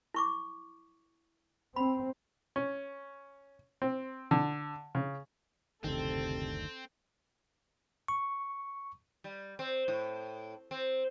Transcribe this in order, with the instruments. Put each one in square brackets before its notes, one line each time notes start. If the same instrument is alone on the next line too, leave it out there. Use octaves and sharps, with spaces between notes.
[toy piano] E4 C#6 D6
[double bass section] C4 [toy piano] B5
[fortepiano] C#4
C4
D3
C#3
[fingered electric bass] F#1 D2 D#3 [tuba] C3 [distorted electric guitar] C4 [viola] A4
[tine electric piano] C#6
[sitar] G3
C4
A2
C4